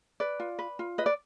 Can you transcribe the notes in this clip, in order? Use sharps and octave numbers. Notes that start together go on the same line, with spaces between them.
B4 D5
F4
B4
F4
B4 D#5
D5